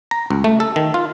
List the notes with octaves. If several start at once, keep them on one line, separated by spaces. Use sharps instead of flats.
A#5
C#2
A3
A4
D#3
F4